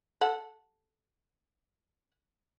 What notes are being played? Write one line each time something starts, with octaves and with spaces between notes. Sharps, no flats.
A4 F#5